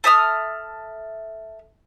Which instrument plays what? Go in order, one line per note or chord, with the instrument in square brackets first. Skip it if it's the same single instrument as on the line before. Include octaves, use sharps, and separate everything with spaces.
[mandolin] A4 E5 D#6 F6